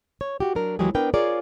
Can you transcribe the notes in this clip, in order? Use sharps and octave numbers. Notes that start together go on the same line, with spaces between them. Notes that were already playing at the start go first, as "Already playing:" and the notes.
C#5
F#4 G4
F#3 D4 A#4
D#2 E3 F#3 G#3 G4 G#4
B3 D4 A#4 B4 G5
F4 G#4 A#4 C#5 D5